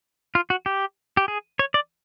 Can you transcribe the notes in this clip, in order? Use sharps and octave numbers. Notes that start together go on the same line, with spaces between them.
F4
F#4
G4
G4
G#4
C#5
D5